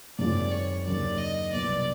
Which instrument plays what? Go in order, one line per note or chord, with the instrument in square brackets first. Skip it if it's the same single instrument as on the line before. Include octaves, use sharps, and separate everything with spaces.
[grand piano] F#2 D#3 G#3 C4 F4 [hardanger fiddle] D5
[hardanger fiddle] C#5
[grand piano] D#2 C#3 F#3 A#3 D4 [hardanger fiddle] D5
[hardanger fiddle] D#5
[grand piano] C2 B2 F#3 B3 [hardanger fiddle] D5